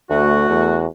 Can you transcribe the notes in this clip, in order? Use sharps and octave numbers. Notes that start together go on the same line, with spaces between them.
D2 A3 F#4
E2